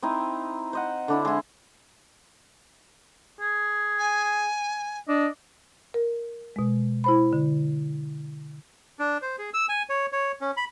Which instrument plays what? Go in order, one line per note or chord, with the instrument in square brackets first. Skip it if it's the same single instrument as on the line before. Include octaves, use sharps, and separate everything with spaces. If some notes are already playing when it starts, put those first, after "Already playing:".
[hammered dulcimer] C4 D#4 E4
C5 D#5 F#5
D3 D4 E4
G#3 E4
[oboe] G#4
[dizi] G#5
[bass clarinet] D4 [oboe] D#5
[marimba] A#4
B2 G#3
E4 C5 B5
D3
[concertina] D4
C5
G#4
E6
G#5
C#5
C#5
C#4
B5